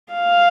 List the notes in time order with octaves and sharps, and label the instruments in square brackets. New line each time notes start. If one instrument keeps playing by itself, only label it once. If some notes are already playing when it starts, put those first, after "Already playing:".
[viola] F5